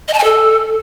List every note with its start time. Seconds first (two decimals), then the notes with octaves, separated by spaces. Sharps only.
0.08 D#5
0.13 A5
0.19 G#5
0.24 A4